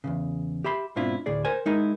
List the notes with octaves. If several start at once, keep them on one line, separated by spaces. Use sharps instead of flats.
E2 G2 C#3
G4 E5 B5 C6
G#2 B2 C4 D4 E4 F4
D2 A2 G#4 D5
A#4 C5 G#5
G#3 D#4 E4 A#4 D#5